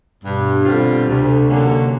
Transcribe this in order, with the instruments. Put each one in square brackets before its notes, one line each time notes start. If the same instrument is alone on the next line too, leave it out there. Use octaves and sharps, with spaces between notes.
[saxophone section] G2 [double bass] B2
[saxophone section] D3 G3 C4 F4
[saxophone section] D2 [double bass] C3
[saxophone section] D3 F#3 A#3 C#4